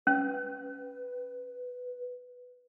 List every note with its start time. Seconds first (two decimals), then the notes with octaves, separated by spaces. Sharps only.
0.07 C#4 B4